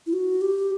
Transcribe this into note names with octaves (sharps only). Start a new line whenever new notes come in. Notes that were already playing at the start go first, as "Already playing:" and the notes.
E4
F#4
G4